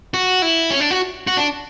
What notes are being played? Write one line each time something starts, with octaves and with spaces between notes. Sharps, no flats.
F#4
E4
C#4
D4
F#4
F#4
D4